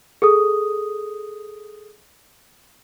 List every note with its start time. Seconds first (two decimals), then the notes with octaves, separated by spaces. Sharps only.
0.22 G#4 A4 D#6